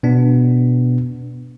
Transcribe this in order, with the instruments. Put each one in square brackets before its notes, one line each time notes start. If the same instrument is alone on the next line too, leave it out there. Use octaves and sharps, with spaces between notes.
[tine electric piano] B2 B3 D4